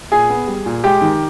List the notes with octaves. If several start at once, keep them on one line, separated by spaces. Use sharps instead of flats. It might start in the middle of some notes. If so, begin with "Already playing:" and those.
A#2 G#4 G#5
B3
G3
A#2
G#3 G4 G5
D#3